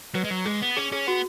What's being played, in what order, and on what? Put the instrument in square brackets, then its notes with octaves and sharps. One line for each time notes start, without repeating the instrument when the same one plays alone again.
[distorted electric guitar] F#3 [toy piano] B4
[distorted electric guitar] G#3
F#3
[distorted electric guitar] G#3 [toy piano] G#4
[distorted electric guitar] B3
[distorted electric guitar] C#4 [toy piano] G#4
[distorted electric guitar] C#4 [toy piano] G#4
[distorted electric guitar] B3 [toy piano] F#4